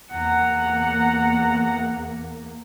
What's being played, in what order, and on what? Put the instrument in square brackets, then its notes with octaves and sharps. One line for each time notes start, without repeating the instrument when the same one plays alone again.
[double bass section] E2 A#3 [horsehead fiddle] F#5 A#5